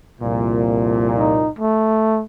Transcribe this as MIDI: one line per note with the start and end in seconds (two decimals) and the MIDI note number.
0.21 1.49 36
0.21 1.49 41
0.21 1.49 46
1.18 1.50 63
1.59 2.23 57